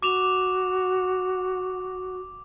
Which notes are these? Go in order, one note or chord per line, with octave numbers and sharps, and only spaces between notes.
F#4 D6 E7 F7